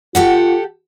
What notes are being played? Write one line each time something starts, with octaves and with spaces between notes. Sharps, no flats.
F4 G4 A4 F#5